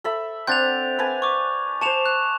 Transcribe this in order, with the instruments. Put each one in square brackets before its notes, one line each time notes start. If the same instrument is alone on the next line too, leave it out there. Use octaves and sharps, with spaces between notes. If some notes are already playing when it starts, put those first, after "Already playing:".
[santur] A4 E5 B5
[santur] C4 D4 F#5 [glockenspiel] G6 A6 F7
[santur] B4 G#5 A5
[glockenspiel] C#6 D6
[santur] C5 C#6 [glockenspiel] A5 E7 F7
[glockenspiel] F#6